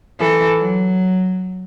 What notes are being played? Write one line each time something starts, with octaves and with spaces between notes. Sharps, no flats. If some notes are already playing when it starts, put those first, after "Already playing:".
E3 A4
F#3